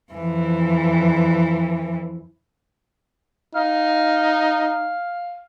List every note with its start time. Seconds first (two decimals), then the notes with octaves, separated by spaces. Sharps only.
0.12 F2 E3
3.55 D#4 F5